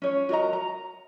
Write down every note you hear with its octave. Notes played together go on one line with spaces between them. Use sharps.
C#4 C#5
F#4 A#4 D#5 A#5
A#5